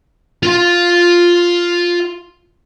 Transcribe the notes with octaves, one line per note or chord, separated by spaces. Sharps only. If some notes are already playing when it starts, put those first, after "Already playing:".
F4 F5